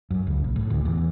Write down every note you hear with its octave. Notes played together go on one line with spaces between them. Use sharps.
F#2
C#2
A#1
A2
D2
E2